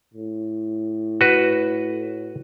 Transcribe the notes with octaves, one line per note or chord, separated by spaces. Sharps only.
A2
F#4 B4